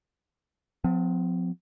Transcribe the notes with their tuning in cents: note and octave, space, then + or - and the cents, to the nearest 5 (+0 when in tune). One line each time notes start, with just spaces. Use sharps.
F3 +30 C4 -40